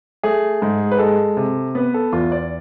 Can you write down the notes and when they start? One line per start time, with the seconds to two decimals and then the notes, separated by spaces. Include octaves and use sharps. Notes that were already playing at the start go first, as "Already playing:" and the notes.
0.23 A3 G#4
0.62 G#2
0.91 B4
0.99 G#3 A4
1.37 C3
1.75 B3 B4
1.94 A4
2.13 E2 F4
2.32 D5